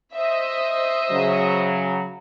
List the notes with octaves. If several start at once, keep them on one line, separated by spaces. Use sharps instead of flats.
C5 D#5 E5
C#3 F#3